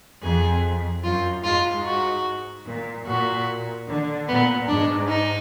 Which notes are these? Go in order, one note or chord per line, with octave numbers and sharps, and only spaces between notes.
F2 G#4
F#2 F4
G#2 F4
F#4
A#2
A#2 F#4
D3
A#2 B3
G#2 D4
D#4